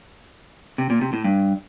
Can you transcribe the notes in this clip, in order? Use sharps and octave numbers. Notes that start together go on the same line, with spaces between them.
C3
A#2
C3
A2
G2